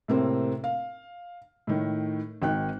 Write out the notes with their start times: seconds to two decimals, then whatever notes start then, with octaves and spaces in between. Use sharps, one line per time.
0.08 A2 C3 A#3 C4
0.64 F5
1.67 A2 D#3
2.42 G#1 D#3 G5 F#6